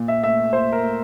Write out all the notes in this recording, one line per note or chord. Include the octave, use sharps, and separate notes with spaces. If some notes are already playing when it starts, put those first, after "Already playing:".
Already playing: A#2
E5
A3 E5
A#2 C5
A#4
A3